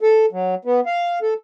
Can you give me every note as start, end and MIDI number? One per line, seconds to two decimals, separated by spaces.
0.01 0.26 69
0.32 0.55 54
0.65 0.80 59
0.86 1.19 77
1.22 1.34 69